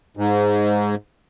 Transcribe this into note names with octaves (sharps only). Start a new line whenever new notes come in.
G#2